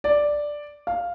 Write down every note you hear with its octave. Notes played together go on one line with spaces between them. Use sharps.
D5
F5